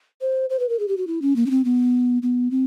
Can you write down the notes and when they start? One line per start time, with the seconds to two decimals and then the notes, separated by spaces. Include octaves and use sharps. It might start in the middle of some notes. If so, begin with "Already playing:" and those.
0.21 C5
0.50 C5
0.59 B4
0.69 A#4
0.79 G#4
0.88 G4
0.97 F#4
1.07 E4
1.22 C#4
1.36 A#3
1.46 C#4
1.50 C4
1.65 B3
2.22 B3
2.51 C4